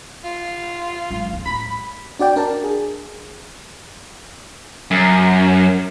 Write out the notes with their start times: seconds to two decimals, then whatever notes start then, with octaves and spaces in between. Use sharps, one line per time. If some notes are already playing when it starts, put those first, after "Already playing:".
0.24 F4
1.10 G#1 F#3
1.33 D#2
1.46 D1 B5
2.19 D4 F#4 D5 G5
2.36 D4 A#4 D5 A5
2.64 G#4
4.91 F#2